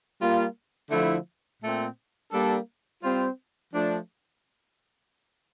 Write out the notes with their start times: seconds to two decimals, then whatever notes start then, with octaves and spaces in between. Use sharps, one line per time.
0.21 G3 A#3 F4
0.91 D3 F3 A3 E4
1.62 A#2 A3 C4
2.32 G3 A#3 D4 A4
3.03 G3 C4 F4 C5
3.73 F3 A3 D4